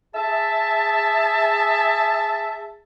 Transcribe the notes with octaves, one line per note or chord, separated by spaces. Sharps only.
G#4 E5 A5